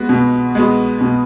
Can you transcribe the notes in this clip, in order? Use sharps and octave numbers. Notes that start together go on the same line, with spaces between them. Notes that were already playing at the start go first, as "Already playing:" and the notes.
Already playing: G#3 B3 F#4
B2
G#3 B3 F#4
B2